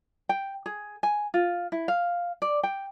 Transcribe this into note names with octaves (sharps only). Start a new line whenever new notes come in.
G5
G#4
G#5
F4
E4
F5
D5
G5